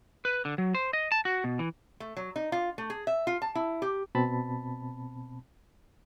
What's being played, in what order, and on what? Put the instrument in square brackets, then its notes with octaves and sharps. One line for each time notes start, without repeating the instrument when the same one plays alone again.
[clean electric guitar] B4
D3
F#3
C5
D#5
A5
F#4
B2
E3
[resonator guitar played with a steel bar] A3
F#3
D#4
F4
A3
G#4
E5
F4
A5
E4
G4
[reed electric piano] B2 C4 A5 B5